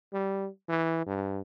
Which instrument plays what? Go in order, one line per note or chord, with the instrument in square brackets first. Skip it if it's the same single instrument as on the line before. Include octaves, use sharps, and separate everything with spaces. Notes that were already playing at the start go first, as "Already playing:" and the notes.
[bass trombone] G3
E3
G2